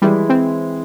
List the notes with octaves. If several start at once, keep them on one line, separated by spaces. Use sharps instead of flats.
E3 G3 G#3 E4
C4